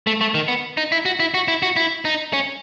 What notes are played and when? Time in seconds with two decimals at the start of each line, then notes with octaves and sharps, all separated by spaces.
0.07 A3
0.21 A3
0.34 D#3
0.48 B3
0.77 D#4
0.92 E4
1.05 F#4
1.20 E4
1.34 F#4
1.48 E4
1.63 F#4
1.77 E4
2.05 D#4
2.33 C#4